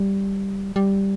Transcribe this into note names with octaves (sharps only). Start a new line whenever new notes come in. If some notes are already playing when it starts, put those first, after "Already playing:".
Already playing: G3
G3